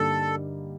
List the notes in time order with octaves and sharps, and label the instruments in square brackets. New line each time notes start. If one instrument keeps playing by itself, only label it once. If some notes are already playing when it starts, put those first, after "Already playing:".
Already playing: [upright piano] G2 D3 G3 A#3 D#4 [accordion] A4